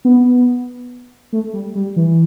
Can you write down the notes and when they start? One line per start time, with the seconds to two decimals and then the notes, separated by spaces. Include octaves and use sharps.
0.05 B3
1.33 A3
1.54 G3
1.75 G3
1.96 E3